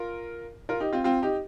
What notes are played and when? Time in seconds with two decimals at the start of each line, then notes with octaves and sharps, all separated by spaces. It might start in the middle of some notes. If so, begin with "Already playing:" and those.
Already playing: F4 A#4
0.69 F4 A#4
0.80 D#4 G4
0.93 C4 F4
1.04 C4 F4
1.22 D#4 G4